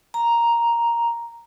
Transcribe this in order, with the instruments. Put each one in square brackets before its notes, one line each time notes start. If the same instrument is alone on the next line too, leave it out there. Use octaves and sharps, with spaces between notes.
[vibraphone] A#5